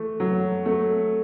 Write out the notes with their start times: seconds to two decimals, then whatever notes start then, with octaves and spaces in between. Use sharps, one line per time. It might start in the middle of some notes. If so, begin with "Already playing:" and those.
Already playing: E3 A3
0.20 F#3
0.66 A3